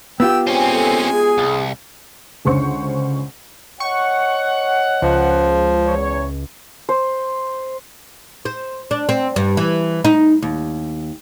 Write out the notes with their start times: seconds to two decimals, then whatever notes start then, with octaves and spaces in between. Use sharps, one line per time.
0.20 B3 F4 G4 G5 E6
0.47 G#3 C4 C#4 G#5
0.70 A4
1.10 G#4
1.38 C2
2.45 C#2 D3 C#4 C5 F#5 C#6
3.80 C#5 D#5 F#5 C#6
5.02 C#2 F3
5.86 E2 C#5
6.89 C5
8.45 C5
8.91 D4
9.09 C4
9.36 G2
9.57 E3
10.05 D#4
10.42 D#2